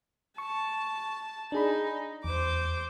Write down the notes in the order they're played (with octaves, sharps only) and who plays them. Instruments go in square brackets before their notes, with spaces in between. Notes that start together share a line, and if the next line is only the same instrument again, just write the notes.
[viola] A5 [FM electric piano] C#6
[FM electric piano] D4 G#4 B5 [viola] D#4
[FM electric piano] E2 [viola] C5 D6